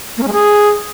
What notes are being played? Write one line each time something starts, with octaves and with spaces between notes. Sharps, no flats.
A#3
C#4
G#3
G#4